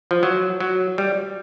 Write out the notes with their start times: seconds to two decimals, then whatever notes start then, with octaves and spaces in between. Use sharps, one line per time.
0.11 F3
0.23 F#3
0.60 F#3
0.98 G3